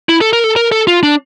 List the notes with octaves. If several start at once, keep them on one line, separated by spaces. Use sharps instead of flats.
E4
A4
A#4
A4
A#4
A4
F4
D4